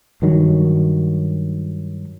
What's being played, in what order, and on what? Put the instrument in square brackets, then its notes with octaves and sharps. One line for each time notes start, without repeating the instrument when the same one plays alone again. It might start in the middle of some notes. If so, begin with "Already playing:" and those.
[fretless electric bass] G2 D#3 F#3